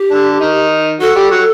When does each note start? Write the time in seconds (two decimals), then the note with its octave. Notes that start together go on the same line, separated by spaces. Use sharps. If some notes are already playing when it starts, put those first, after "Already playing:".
Already playing: G4
0.10 D3 D4
0.40 D#3 D#4
1.00 F#3 F#4 A4
1.16 G3 G4
1.31 F#3 F#4